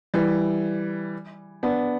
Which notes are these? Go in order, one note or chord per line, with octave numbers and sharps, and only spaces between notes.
E3 G3
B3 D4